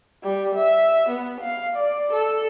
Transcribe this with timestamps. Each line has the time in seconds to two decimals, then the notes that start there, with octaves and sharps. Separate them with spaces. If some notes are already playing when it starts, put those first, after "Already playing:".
0.23 G3
0.55 E5
1.09 B3
1.41 F5
1.76 D5
2.13 A4